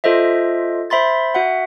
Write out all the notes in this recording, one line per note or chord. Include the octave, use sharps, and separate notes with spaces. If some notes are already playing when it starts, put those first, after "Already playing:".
F4 A4 C5 D#5 E5
C5 E5 B5 C6 A6
F#4 E5 F#5